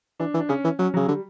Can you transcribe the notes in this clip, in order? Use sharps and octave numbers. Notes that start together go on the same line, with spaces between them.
E3 D4
E3
D4
C#3 C#4
E3
F#3 C#4
C#3 F#3
D3 G3